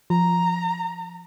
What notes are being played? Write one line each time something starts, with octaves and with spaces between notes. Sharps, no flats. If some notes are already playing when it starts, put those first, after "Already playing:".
F3 A#5